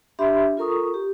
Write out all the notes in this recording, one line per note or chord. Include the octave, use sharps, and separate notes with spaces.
D4 G4 E5 B5 C6
F4 A4 A#4 A#5 C#6 D#6
G4